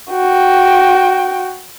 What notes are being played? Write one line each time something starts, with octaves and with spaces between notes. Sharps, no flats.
F#4 G5